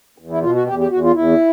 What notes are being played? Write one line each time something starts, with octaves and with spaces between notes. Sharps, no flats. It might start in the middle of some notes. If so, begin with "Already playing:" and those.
E2
E4
B2 F4
F#4
E2 G4
G4
E2 F#4
F4
E2 E4